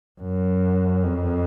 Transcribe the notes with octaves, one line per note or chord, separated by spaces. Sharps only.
F#2
F2